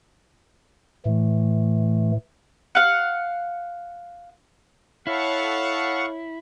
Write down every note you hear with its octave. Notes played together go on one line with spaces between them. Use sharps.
A2 E3 A3
F5 F#5
E4 A4 C#5 F5 F#5 B5 C#6